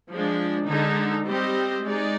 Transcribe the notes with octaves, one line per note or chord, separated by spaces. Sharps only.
F3 G#3 D4
D3 G#3 D#4
G3 C4 G4 C5 D#5
G#3 D#4 G#4 D5